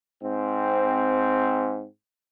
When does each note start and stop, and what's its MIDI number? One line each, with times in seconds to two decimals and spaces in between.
0.24 1.84 44
0.24 1.84 60